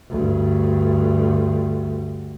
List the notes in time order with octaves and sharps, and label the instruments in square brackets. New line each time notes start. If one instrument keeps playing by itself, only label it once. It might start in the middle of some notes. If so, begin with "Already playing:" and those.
[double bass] D2 G2